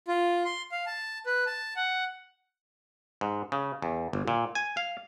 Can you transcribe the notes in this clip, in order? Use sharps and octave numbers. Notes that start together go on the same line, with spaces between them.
F4
C6
F5
A5
B4
A5
F#5
G#2
C#3
E2
G1
A#2
G#5
F5